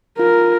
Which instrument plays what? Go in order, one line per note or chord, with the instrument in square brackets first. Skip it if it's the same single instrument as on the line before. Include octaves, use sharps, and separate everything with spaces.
[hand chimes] F4 [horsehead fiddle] A#4